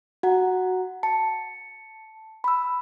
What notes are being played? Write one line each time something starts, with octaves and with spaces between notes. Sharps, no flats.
F#4 F#5 A#5
A5 C#7
B5 E6